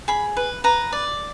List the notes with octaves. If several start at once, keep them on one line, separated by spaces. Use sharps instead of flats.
G#4 B5
B4
B4 A#5
D5